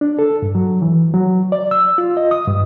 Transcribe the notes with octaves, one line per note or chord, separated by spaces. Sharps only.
D4
A4
G2
F#3
E3
F#3
D5
E6
F4
D#5
D#6
G2